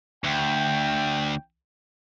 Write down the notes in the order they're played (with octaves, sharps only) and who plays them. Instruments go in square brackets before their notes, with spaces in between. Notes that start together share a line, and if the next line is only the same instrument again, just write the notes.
[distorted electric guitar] D2 [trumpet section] G5